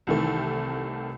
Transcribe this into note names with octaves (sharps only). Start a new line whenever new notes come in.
C2 C3 D#3 E3 A3